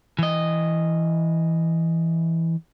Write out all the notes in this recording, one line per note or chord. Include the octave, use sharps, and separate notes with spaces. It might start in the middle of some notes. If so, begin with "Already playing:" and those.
E3 D#5